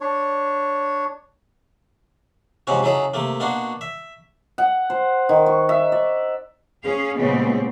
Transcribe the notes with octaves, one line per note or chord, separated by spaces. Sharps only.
D4 C#5
G#2 C3 F3 C4 C#4 F#4
C#3 F#3 D#4 E4 G#4 A4
C3 A3 A#3
B2 A#3 D4 F#4 C6
E5
F#5
C5
D#3
C#6
E5
D5
C#4 G#4 F5
A#2 C#3 G3 G#3 B3 C4